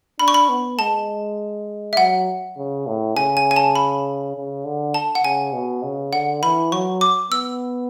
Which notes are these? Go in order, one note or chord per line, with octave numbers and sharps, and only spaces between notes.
D4 B5
C#6
B5
B3
G#3 A5
E5
F#3 F#5
C#3
A2
C#3 G#5
G#5
G#5
A5
B5
C#3
D3
A5
F#5
C#3 G#5
B2
C#3
D3 F#5
E3 B5
F#3 C#6
D6
B3 E6